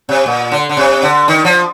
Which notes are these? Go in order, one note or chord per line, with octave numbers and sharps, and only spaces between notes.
C3
A#2
D3
D3
C3
D3
D#3
F3